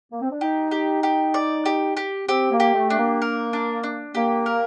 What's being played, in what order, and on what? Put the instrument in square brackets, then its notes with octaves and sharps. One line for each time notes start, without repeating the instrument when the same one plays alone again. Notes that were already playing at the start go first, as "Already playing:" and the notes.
[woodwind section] A#3
C4
D4
[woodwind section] D#4 [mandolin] G4
[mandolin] G4
G4
D5
G4
G4
[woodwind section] C4 [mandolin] G4
[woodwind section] A#3
[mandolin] G4
[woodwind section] A3
[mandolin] D4
[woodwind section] A#3
[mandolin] A#4
D4
D4
[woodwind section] A#3 [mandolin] G4
[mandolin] A#4